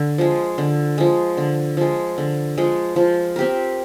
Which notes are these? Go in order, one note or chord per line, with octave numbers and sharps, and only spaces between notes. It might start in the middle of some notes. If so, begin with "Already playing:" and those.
Already playing: D3
F3 G#3
D3
F3 G#3
D3
F3 G#3
D3
F3 G#3
F3
C4 G4 A#4